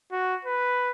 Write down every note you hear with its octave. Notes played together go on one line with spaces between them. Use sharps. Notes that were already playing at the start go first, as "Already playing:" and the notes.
F#4
B4